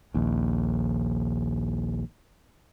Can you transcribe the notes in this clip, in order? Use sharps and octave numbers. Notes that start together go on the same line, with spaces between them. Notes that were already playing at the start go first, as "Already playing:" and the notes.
A#1 D#2